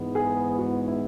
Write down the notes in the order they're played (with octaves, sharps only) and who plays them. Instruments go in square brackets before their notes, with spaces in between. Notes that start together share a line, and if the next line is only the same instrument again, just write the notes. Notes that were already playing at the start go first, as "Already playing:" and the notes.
Already playing: [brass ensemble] G#2 E3 B3
[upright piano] G#4
F#4
E4